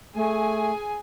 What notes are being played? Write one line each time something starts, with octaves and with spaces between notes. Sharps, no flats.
A3 G#4 G#5